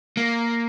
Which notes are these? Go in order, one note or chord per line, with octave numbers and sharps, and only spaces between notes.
A#3